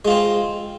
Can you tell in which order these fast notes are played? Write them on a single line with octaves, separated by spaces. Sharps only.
G#3 F4 C4